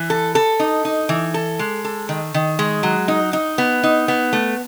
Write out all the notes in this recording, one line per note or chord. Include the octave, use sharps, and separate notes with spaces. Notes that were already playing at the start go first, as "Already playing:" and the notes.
Already playing: E3
A4
A4
D#4
D#4
E3
A4
G#3
A4
D#3
D#3
G#3
F#3
D#4
D#4
B3
D#4
B3
A3